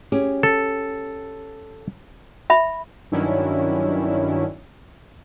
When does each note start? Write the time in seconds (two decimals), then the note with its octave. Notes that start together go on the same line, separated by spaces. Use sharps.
0.12 C#4 G4 G#4
0.43 A4
2.50 E5 B5
3.11 G2 D#3 F#3 C#4 D4 E4